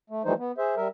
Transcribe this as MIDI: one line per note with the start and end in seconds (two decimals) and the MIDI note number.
0.10 0.22 57
0.25 0.33 52
0.25 0.33 53
0.25 0.33 55
0.25 0.33 57
0.25 0.33 63
0.25 0.33 72
0.38 0.52 59
0.58 0.75 68
0.58 0.75 72
0.58 0.75 76
0.77 0.88 55
0.77 0.88 70
0.77 0.88 76